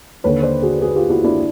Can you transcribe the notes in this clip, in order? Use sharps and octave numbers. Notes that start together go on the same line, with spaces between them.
D#2 D3 B4 C#5
C5 D5
F#4 G#4
F#4 G#4
F4 G4
E4 F#4
D4 E4